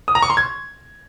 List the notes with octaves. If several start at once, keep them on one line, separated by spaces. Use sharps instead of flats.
D#6
A#5
C#6
C6
G#6